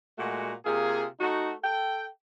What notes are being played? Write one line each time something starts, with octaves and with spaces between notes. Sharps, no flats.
A#2 G#3 A3 F#4
C3 A#3 F4 G#4
A3 D#4 F#4
A4 G5